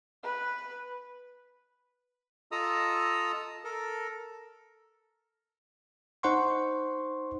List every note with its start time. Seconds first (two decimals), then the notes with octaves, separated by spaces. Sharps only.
0.23 B4
2.52 F4 A4 D#5 A#5 D#6 E6
3.64 A4 A#4
6.23 D#4 C5 F#5 C6 C#6